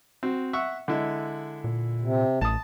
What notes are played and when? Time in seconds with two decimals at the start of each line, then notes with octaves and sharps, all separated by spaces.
0.23 C4 F#4
0.53 E5 F#5 C#6
0.88 D3 G#3 E4
1.64 A#2
2.01 C3
2.41 A1 A5 D#6